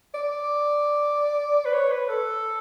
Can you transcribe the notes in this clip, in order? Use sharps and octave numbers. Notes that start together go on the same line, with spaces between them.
D5
B4
C#5
B4
A4